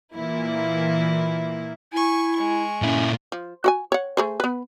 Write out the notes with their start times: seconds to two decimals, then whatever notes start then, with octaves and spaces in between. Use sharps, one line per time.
0.15 A#2 E3 A#3 E4
1.92 E4 G#5 C#6
2.35 G#3 C#6
2.82 A#2 C#4 E4
3.32 F3
3.64 F#4 F#5 G#5
3.92 C#5 F#5
4.17 A3 G#4 C5
4.40 B3 B4